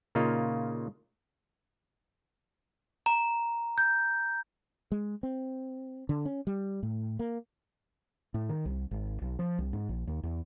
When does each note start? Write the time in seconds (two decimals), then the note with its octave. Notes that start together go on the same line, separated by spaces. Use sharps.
0.15 A#2 C#3 A#3 D#4 F4
3.06 A#5
3.78 G6
4.92 G#3
5.23 C4
6.09 D3
6.25 C#4
6.47 G3
6.83 A2
7.19 A#3
8.34 A2
8.49 D#3
8.65 C2
8.91 G#1
9.22 B1
9.39 F3
9.59 C2
9.73 G#2
9.89 A#1
10.07 D#2
10.23 E2